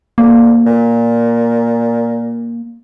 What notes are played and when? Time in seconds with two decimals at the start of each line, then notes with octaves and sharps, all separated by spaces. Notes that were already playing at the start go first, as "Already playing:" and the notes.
0.18 D2 A#3
0.66 A#2